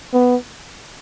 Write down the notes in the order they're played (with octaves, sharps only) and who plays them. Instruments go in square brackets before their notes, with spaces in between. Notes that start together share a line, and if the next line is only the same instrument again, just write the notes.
[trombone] B3